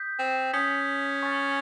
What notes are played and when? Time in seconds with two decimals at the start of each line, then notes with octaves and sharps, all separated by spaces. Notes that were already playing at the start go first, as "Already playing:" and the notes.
Already playing: D#6 G6 B6
0.19 C4
0.53 C#4 D#6 G6 B6
1.23 G#5 C#6 F6 A6